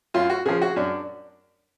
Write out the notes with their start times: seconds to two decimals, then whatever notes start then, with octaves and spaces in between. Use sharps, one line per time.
0.14 F#2 F4
0.30 F#4
0.46 C#3 F3 G#4
0.62 F#4
0.76 F#2 D4